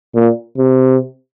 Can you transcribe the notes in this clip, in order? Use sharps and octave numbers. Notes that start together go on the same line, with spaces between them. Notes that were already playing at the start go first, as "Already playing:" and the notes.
A#2
C3